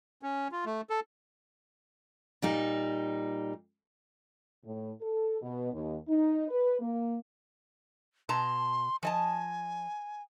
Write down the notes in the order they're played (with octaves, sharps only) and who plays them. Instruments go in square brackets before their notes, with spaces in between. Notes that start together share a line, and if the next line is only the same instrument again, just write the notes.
[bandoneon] C#4
F4
A3
A4
[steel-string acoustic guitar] A#2 G3 D#4
[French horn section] A2
A4
B2
D#2
D#4
B4
A#3
[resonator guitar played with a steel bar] B2 A5 A#5 [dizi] C6
[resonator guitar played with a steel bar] F3 D#5 A5 [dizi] G#5